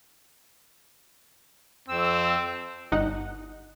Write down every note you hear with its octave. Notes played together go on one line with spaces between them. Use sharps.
F2 C4 E6
G1 D#4 F#5